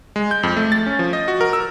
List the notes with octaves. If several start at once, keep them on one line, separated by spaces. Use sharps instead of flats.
G#3
G6
F2
A3
A6
C#4
F3
D#5
F#4
A#4
E6